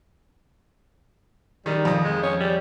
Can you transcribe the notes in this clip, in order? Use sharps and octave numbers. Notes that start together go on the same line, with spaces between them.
D#3 G3
F2 D#6
G#3
C#4
G3